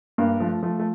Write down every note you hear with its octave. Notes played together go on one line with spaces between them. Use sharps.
G2 A#3
F3 A3
F3 A3
A3